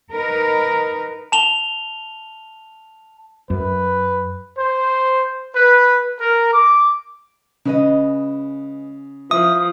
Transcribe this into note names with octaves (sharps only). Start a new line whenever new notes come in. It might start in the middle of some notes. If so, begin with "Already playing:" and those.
D#4 A#4 B4
A5 F7 G7
F#2 B4
C5
B4
A#4
D6
C#3 G#3 B4 D#5
F3 E4 E5 D#6